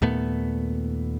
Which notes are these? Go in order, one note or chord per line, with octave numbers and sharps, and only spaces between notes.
D#2 A#2 A3 B3